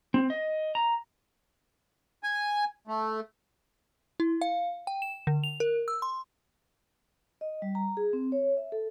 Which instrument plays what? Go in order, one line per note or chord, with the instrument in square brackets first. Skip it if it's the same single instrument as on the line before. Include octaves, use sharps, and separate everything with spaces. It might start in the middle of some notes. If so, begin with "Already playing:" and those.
[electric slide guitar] C4
D#5
A#5
[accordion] G#5
A3
[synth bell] E4
F5
G5
E7
D3
F7
A#4
E6
C6
[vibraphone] D#5
G3
A#5
G#4
C4
C#5
E5
A4